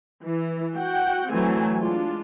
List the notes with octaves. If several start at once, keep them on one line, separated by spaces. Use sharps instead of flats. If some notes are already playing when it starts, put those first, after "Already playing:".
E3
F#4 F#5 G5
E3 F#3 A3 C4 G#5
G#3 D4 F4